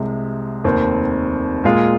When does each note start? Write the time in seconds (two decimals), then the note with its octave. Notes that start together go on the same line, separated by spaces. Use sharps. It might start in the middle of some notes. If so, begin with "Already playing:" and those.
Already playing: C2 C3 G#3
0.64 F1 D#2 D#3 C4
1.64 A#2 G#3 F4 G#4